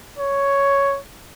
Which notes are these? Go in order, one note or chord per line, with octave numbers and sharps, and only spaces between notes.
C#5